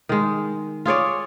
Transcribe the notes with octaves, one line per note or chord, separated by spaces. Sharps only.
D#3 G#3
F4 G#4 C#5 D5